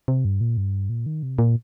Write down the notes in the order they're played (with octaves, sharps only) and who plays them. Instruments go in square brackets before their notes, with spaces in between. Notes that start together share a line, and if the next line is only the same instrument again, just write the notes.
[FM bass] C3
G2
A#2
G2
A#2
D#3
C3
A#2